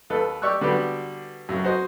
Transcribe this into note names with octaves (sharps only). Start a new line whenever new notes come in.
D#2 A4 B4
G4 D5 C#6 E6 F#6
D3 G3 B3 D4 F#4 G4
F#2 C#3 F#3
F#4 C5 D#5